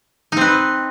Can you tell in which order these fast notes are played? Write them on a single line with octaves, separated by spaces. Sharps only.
D#4 C4 B4